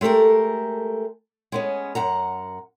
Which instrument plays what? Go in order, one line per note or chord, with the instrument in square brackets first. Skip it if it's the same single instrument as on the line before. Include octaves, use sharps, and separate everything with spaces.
[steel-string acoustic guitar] G#3 A3 G4 A4 A#4
G#3 B3 C#4
F#2 F#5 A#5